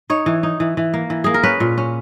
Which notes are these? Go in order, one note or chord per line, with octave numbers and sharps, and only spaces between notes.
D#4 C#5
E3
D#4
E3
E3
A#3
E3
A#3 G#4
A#4
C#4 B4
A#2
C#4